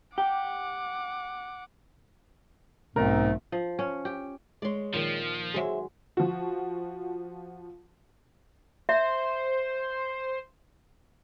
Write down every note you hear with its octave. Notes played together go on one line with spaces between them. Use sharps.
G4 F#5 D6
B1 G#2 A3 C4 A#4
F3
C#4
G4
G#3 C#5 D5 C6
A#2 D#3 F3
F#3 G#3 G#4 C5 E5
F3 F#4
C5 E5